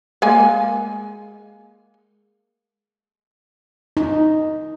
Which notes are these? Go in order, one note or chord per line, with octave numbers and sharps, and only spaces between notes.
G#3 A#3 G#5
D#4